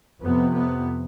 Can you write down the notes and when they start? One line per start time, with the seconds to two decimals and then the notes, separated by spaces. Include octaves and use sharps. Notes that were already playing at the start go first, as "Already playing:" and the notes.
0.21 F2 C3 B3
0.54 B3